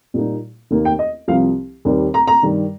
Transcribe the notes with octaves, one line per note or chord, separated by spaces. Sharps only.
A#2 G3 A#3 D#4
D#2 D#3 A#3 D#4
G5
D#5
C2 C3 F3 C4 F5
D#2 D#3 G3 C4
A#5
A#5
G2 D#3 G3